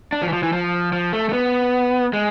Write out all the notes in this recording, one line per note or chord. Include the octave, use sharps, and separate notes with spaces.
D4
F3
E3
F3
E3
F3
F3
A3
A3
B3
G#3